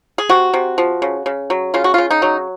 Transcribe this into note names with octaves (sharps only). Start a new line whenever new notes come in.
G#4
C3 F#4
C3
F3
C#3
C#3
F#3
C#3 F4
F#4
C#3 F4
D#4
F#3